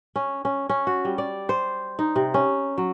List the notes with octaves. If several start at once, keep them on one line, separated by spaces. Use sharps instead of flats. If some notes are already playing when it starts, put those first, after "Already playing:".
C#4
C#4
C#4
F#4
G3
D5
C5
D#4
C3
C#4
F#3